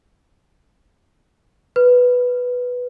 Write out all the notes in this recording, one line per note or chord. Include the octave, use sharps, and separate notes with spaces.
B4